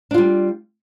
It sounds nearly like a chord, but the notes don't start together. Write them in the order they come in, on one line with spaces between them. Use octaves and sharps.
D4 F4 G3